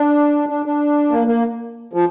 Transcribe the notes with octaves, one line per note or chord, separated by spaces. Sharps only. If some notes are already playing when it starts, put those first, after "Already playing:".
Already playing: D4
D4
D4
A#3
A#3
F3